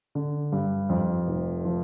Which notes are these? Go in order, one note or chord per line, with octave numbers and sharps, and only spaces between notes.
D3
G2
F2
F1
F3